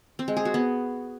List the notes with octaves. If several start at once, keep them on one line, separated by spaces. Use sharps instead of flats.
C4
G#3
G#4
F#4
B3